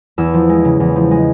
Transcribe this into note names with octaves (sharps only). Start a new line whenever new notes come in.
E2 E6
F3
G#3
C#3
E2
F3
G#3